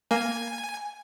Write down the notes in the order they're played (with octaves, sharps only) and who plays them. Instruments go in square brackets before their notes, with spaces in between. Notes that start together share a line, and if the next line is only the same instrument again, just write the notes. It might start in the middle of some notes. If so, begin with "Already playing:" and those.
[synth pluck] A#3 [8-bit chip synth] G#5